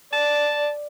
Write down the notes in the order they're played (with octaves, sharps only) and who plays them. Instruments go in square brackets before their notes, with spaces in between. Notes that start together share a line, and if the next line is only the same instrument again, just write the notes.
[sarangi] D5 [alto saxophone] A5